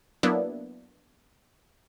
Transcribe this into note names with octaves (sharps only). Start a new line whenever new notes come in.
F#3 A#3 B3 D4 E4